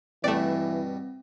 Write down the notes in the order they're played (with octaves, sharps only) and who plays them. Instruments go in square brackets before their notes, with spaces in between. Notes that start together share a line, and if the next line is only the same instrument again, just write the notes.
[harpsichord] G2 B2 [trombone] E3 [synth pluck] A3 D5 [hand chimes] C4